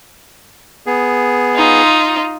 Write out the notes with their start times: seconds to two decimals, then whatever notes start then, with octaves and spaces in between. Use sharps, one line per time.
0.86 B3 G#4
1.55 D#4 F4